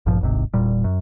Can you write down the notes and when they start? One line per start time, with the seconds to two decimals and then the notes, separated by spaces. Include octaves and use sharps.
0.06 A1 G2 A#2 F3
0.21 D1 G#1 G#2 C3
0.54 E1 A#2 G3
0.84 F#2